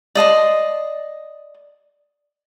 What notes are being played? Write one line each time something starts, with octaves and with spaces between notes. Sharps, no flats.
D5 D#5 A5 C6